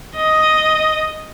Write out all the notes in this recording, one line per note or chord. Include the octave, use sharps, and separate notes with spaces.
D#5